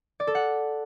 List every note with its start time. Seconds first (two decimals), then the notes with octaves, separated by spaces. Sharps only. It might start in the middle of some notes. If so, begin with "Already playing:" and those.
0.20 D5
0.27 A4
0.35 F#5